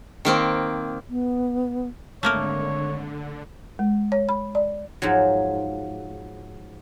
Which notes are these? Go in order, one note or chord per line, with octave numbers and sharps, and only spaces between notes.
D#3 A#3 C4
B3
G#1 D3 A3 A#3 A#4 C#5
G#3
C#5
B5
D5
G#2 F3 F#3